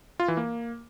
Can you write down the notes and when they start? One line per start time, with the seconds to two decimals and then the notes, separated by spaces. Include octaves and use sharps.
0.20 F4
0.28 E3
0.37 A#3